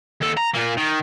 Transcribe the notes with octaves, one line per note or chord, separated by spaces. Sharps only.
D#2 A4
A#5
A#2 A#3
D#3